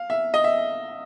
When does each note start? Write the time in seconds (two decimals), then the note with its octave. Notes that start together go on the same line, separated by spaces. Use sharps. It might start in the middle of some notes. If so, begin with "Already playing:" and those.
Already playing: F5
0.10 E5
0.34 D#5
0.44 E5